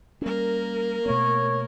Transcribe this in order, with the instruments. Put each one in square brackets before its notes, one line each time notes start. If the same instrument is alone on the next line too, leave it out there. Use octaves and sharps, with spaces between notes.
[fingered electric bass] G3 C#4 [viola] A#3 A#4
[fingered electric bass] B2 A3 B3 [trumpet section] C#5